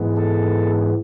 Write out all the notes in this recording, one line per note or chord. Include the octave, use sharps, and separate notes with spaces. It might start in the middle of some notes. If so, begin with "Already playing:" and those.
Already playing: G#2 E3 G#3 B3
A4